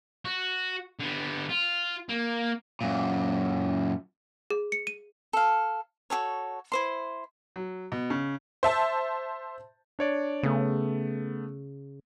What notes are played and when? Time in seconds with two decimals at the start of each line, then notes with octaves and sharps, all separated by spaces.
0.25 F#4
0.99 D3 B3
1.49 F4
2.09 A#3
2.81 F#2 A#2
4.50 G#4
4.72 C#7
4.87 D#7
5.33 A4 F5
6.10 F#4 G4 A4 C#5
6.72 E4 C5 C6
7.56 F#3
7.92 B2
8.10 C#3
8.63 C5 E5 A5
9.99 D4 C#5 D5
10.43 C#3 A3 B3